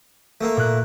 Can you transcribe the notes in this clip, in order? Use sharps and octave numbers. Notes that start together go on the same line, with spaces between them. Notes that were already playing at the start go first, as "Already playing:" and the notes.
A3 A#3
A#2 F#6